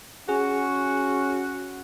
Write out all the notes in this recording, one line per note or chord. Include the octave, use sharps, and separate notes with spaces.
C#4 F#4 G#4